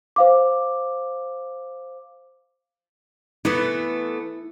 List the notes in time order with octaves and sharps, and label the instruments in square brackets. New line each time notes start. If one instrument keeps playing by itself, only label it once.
[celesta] C5 F5 D6
[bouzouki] E3 A3 B3 [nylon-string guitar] E4